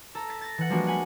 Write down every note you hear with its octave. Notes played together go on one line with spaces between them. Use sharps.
A4 A#5
A6 B6
A6 A#6
E3 F#5
F3 G3 G#3 A#3 D4 F#4
F#5 G#5 B5